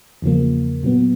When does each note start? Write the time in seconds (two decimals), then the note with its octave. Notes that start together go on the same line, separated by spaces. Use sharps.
0.22 E2 C#3 F3 A#3
0.83 A#2 F#3 B3